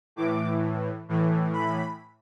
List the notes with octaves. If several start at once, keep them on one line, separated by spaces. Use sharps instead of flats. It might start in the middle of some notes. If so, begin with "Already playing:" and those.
A2 E3 D6
A2 E3
B5